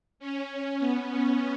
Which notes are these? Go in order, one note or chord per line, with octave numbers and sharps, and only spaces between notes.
C#4
B3
C#4